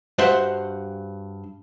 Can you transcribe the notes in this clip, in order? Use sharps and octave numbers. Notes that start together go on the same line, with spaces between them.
G2 F#4 C5 E5 F#5 C6